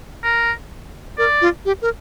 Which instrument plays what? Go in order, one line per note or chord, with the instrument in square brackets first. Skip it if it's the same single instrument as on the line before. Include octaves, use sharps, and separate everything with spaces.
[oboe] A#4
[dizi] A#4 [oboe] D5
[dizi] F4
G4
A#4